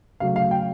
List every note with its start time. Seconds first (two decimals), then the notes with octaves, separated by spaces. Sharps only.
0.20 C#3 F#3 A3 F5
0.36 F5
0.51 G5